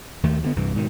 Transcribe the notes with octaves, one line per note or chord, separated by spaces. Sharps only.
D#2 D#3 A3
G2 D3 B3
C2 G2 E3
G#2 B2 D#3